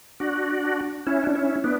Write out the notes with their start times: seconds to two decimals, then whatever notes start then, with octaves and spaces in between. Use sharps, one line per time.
0.20 D4 F#4
1.07 C#4 E4
1.24 D4
1.35 C#4 E4
1.64 B3 D4